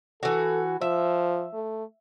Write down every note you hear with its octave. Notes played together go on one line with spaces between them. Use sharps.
E3 F#4 A4
F3 E5
A3